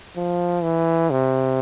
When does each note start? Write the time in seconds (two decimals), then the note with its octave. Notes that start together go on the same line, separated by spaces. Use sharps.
0.17 F3
0.63 E3
1.11 C3